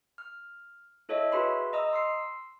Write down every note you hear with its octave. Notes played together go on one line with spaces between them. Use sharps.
F6
E4 A4 C#5 D#5 E5
F#4 G#4 B4 E5 B5 C6
D#5 A#5 D#6 E6
C6 E6 C7